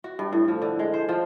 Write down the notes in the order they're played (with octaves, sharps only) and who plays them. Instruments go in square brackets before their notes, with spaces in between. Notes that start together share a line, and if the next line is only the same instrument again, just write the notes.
[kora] F#4
G2
A2
F3
D3
G#3
C5
F3